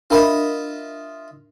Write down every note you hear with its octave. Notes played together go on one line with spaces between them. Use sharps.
D4 F4 A#4 D#5 E5 B5